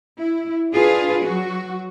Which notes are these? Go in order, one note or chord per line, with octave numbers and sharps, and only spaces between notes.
E4
D4 F4 G#4 B4
F#3 F#4